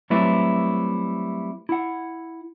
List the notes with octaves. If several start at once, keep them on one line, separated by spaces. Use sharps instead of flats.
F#3 G3 A3 C4 E4 B4
E4 F#5